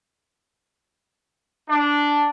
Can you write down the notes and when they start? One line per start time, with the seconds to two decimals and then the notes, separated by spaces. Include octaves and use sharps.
1.69 D4